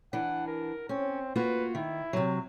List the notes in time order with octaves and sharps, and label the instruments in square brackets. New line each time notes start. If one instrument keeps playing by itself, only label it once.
[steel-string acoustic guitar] E3 D4 [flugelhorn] F#5
[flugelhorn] A#4
[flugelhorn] C4 [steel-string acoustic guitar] C#4
[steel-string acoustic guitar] A#3 F4 F#4 [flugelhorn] B4
[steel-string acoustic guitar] D#3 [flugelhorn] E4
[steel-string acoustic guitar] C3 F#3